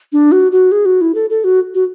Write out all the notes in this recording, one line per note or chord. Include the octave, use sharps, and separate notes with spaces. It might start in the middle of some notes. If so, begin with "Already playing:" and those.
D4
F#4
F#4
G#4
F#4
E4
A4
A4
F#4
F#4